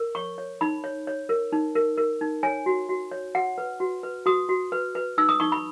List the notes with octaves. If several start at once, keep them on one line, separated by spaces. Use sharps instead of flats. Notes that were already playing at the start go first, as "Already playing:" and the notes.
Already playing: A#4
C#5 C#6
C#5
D#4 B5
C#5
C#5
A#4
D#4
A#4
A#4
D#4
C#5 G#5
F#4
F#4
C#5
F#4 F#5
B4
F#4
B4
F#4 D#6
F#4
B4
B4
D#4 E6
D#6
D#4 C#6
B5